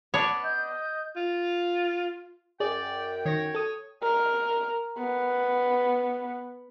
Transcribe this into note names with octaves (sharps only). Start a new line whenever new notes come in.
B3 D4 C#5
D#5 G6
F4
F#2 G#4 D5 G5
D#3 C#5 A#6
A4 D#6
A#4
B3